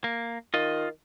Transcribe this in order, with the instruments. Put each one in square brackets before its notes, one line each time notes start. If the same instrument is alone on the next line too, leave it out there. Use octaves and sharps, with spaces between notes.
[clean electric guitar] A#3
[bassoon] D#3 [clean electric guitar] F4 D#5